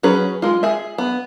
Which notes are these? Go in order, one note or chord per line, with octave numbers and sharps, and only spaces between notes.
F#3 C#4 G#4 B4
G#3 F4
G#4 E5
B3